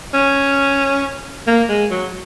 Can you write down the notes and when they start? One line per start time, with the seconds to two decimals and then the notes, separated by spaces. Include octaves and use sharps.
0.14 C#4
1.47 A#3
1.69 G#3
1.91 F#3